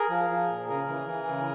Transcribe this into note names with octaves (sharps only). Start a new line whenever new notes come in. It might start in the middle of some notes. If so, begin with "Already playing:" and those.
Already playing: G#4 A#4
F3
F3
A#2
C#3 G#4 A#4
E3
E3
C#3